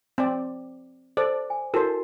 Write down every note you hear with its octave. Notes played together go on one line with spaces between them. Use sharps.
C4 D5
A4 C5 D5
G#5
E4 F#4 A4 A#4 C5